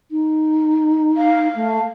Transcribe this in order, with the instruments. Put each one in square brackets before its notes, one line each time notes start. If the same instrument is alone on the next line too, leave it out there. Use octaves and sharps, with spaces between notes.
[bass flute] D#4
[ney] F5
[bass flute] A3